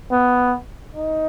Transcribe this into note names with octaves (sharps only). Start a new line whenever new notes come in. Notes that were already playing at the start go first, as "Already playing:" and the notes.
B3
D#4